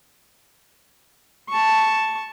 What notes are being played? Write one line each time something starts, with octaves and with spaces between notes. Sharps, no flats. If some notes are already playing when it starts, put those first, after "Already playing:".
A5 C#6